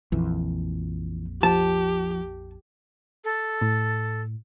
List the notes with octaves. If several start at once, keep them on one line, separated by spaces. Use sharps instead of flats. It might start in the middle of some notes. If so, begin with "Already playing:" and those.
A#1 F2 E3
F3 G4 A5
A4
A2